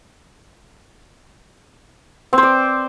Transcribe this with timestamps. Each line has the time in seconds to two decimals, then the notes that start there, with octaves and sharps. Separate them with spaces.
2.33 C4
2.38 C5
2.43 D5